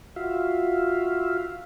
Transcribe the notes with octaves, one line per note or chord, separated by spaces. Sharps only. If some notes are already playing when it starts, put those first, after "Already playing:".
F4 F#4 E5 F5